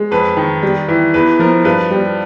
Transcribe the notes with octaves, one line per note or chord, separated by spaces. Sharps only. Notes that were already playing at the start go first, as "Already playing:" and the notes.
Already playing: G#3
F2 B4
D#3
G3
E3
E2 B4
F3 A#4
G2 B4
G3